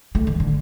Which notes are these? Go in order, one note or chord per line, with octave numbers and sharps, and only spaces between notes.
A3
D#3
D3